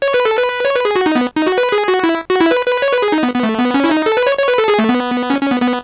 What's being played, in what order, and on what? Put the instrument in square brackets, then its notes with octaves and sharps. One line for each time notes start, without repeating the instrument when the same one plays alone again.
[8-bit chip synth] C#5
B4
A4
B4
C#5
B4
G#4
F#4
D#4
B3
D#4
F#4
B4
G#4
F#4
E4
F#4
E4
B4
B4
C#5
B4
G#4
D#4
B3
B3
A3
B3
C#4
E4
D#4
A4
B4
C#5
C#5
B4
A4
G#4
A3
B3
C#4
C#4
B3
B3